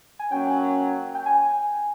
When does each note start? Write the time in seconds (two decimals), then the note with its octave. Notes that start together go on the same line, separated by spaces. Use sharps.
0.19 G#5
0.31 F#3 A#3 C#4 G5
1.15 G5
1.26 G#5